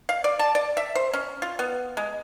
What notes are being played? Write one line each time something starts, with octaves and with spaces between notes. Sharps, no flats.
F5
D5
A5
D5
E5
C5
C#4
F4
B3
G#3